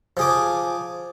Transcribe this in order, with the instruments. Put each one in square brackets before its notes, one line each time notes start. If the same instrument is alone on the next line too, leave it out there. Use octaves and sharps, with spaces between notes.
[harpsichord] F3 G#4 D6